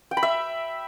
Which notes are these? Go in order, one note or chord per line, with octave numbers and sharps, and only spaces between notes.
G5
B5
E5